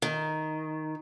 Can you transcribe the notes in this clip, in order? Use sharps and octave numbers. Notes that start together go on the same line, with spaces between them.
D#3